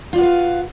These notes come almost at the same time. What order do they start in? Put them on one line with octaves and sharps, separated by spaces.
F4 D5 F#4 B4 F5